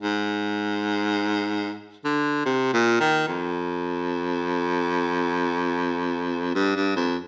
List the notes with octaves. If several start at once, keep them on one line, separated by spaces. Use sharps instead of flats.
G#2
D3
C3
A#2
D#3
F2
G2
G2
F2